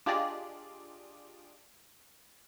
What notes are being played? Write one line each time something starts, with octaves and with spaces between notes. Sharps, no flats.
D4 F4 G4 G#4 D5 D#5